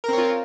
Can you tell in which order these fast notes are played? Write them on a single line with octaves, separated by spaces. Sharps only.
A#4 C4 C#5 F4